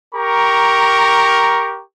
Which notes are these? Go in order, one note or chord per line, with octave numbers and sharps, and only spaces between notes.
G4 A#4 A#5 C#6